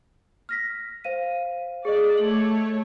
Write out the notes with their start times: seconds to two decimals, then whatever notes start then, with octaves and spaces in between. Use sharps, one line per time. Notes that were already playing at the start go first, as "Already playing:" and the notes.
0.49 F6 A#6 B6
1.04 C5 F5 D#7
1.85 G#4 D5 D#5
2.17 A3 C#5 F#7